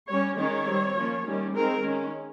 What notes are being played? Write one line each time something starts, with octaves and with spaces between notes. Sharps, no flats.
G3 C#4 C#5
D#3 G#3 C#4 C#5
G3 C4
F3 A#3 C#4
D#3 G3 C#4
D#3 G#3 C4 A#4
D#3 G#3 C#4